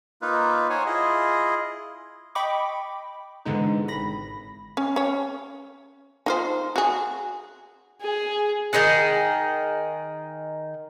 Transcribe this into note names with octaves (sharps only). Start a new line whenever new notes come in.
A#3 D#4 F4 B4
C5 C#5 F#5 G#5
E4 F4 G#4 D#5
D#5 G5 B5 C#6 D6
G#2 B2 D3 E3 G#3 D#4
G#1 B5 A#6
C#4
C#4 C#5
D#4 F4 C5
F#4 G#4
G#4
D#3 D#4 G#4 F#5